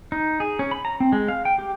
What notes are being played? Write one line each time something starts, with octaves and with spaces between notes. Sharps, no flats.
D#4
G#4
C#4
B5
A#5
C4
G#3
F5
G5
G4